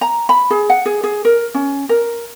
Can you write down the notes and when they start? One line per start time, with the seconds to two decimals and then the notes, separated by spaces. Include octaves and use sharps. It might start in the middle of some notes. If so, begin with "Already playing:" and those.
0.01 A#5
0.29 B5
0.51 G#4
0.70 F#5
0.86 G#4
1.03 G#4
1.25 A#4
1.54 C#4
1.89 A#4